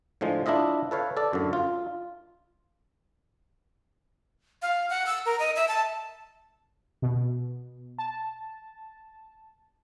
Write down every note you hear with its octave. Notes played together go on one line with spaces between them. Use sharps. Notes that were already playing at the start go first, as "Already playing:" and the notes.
A2 D3 F3 G#3
D4 E4 F4 D#5 E5
A4 B4 C#5 F5
A4 D5
F#2 A2 D3
F4
F5
F#5
E6
A#4
D#5
E5
A5
B2
A5